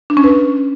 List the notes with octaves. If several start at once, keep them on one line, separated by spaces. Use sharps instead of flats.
D4
C#4
B4